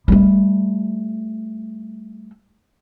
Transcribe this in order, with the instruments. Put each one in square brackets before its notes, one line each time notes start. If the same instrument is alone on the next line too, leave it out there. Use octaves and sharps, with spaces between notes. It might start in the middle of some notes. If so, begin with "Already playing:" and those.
[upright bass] G3 A3